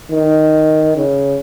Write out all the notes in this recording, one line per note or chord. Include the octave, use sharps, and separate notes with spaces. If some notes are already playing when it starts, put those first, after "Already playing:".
D#3
C#3